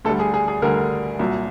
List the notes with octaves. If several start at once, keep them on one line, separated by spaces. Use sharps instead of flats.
D2 D3 G3 A4
G#4
G#4
G#4
D2 D3 G3 A#4
C2 A#2 F#3